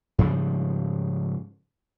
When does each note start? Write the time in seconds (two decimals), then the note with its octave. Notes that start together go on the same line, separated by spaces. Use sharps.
0.18 G#2 C#3 F3 G3